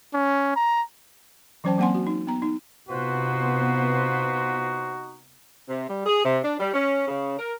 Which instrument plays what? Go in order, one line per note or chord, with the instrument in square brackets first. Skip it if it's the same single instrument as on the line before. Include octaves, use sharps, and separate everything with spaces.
[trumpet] C#4
A#5
[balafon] E3 F#3 C#4 C5 G5 A5
F#3 A#3 C4 F#5 G#5 C6
F#4
D#4
B3 A#5
D#4
[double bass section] C3 B3 [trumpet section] D#4 F#4 [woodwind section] F4 B4 C5
[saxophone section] C3
G3
G#4
C3
D4
G3
C#4
C#3
A#4